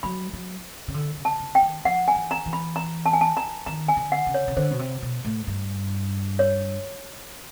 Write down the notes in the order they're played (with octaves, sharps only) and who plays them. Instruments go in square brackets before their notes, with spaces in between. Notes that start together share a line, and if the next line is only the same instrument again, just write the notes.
[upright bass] F#3 [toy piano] B5
[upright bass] F#3
C#3
D3
C#3
[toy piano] A5
[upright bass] C#3
[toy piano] G5
[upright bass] D#3
[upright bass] F3 [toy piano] F#5
[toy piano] G#5
[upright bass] E3
[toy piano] A#5
[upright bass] E3
[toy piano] B5
A#5
A5
G#5
A5
A#5
[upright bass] D#3 [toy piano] A#5
[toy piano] G#5
[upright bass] D3
[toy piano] F#5
[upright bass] C#3
[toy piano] C#5
[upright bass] C#3
[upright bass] D3 [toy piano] C5
[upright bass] B2
C3
B2
A2
G2
[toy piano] C#5